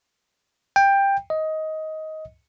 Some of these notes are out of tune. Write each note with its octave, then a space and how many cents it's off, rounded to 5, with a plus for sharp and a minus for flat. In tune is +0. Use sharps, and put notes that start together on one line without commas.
G5 +15
D#5 +15